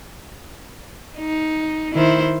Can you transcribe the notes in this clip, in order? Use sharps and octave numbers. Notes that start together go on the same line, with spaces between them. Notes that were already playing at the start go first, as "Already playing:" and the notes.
D#4
D#3 E4 C5